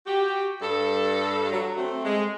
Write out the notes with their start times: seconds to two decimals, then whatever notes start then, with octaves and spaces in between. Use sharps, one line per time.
0.07 F#4 G4
0.61 G2 A4
1.51 F#3
1.78 A3 C4
2.05 G#3